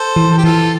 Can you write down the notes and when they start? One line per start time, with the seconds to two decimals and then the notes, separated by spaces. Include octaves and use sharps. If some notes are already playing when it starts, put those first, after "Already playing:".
Already playing: A4 C5
0.16 E3
0.31 A4
0.38 G4
0.44 E3 F4 A4